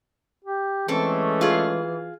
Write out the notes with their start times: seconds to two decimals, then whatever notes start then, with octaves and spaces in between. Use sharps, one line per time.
0.44 G4
0.88 E3 G#3 A3 C4 C#4 A4
1.41 F4 G#4